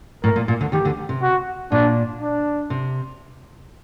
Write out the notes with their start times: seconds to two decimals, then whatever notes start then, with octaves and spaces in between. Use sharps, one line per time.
0.23 A2 A#4
0.36 A#2
0.48 A#2
0.61 D2 D3
0.72 D#2 D#3 G4
0.85 D2 D3
1.09 C3
1.22 F#4
1.72 A#2 D4
2.21 D4
2.70 C3